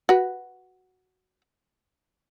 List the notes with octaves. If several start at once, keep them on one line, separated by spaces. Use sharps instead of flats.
F#4 B4